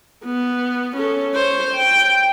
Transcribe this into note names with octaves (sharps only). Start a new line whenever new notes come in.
B3
C#4 A4
C5 C#5
G5